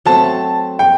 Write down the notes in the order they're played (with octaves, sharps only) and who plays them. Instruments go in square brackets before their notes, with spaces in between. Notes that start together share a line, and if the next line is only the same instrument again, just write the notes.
[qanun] F#3 A3 C4 [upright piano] A5
[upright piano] G5